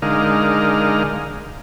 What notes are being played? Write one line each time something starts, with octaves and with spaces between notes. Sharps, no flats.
D3 G#3 D#4 A#4 F5